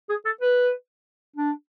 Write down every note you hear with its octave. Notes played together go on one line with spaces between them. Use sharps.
G#4
A4
B4
D4